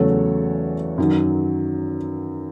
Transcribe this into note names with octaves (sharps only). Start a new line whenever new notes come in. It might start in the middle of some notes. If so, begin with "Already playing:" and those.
Already playing: E2 C#3 F#3 A3 A4 C#5
F#2 D#3 F#3